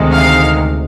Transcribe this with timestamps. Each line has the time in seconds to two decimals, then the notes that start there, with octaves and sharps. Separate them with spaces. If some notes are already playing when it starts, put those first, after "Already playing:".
Already playing: D2 C3 D#3 G#3
0.15 F5